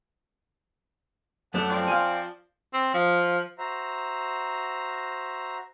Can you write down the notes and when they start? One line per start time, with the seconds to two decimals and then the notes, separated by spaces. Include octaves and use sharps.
1.54 F#2 A3 D4 A4 F#5
1.70 F3 C4 D5
1.88 F5 G#5
2.73 C4
2.94 F3
3.58 F#4 C5 E5 A#5